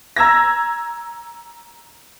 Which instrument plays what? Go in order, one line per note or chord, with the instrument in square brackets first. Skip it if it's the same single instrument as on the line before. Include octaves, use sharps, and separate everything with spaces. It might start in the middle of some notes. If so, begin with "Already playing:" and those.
[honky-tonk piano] A#5 E6 G#6 A#6